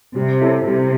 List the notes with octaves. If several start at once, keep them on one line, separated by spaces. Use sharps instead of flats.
C3 G3
C4 E4 A4 C#5
C3 G3